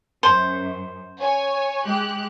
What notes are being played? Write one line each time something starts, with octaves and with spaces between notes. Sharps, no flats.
F#2 C5
C#5 G#5
G#3 G4 F#6